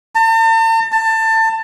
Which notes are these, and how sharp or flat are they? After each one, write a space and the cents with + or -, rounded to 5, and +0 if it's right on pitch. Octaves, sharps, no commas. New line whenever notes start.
A5 +45
A5 +25